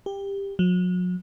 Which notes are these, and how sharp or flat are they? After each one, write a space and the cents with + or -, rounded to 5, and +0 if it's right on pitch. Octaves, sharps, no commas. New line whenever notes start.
G4 +15
F#3 -40